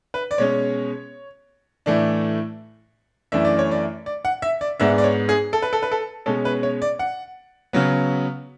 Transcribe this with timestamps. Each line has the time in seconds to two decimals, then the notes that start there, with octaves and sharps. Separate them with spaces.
0.14 B4
0.31 D5
0.38 B2 G#3 C#4 C#5
1.86 A2 E3 A3 D4
3.32 F#2 E3 A3 D4 E5
3.45 D5
3.59 C#5
3.71 D5
4.06 D5
4.25 F#5
4.42 E5
4.61 D5
4.80 G#2 G#3 B3 D4 E5
4.98 D5
5.04 C#5
5.29 G#4
5.53 A4
5.62 B4
5.73 A4
5.83 B4
5.91 A4
6.26 B2 G#3 C#4 A4
6.45 B4
6.63 C#5
6.82 D5
6.99 F#5
7.73 C#3 F#3 B3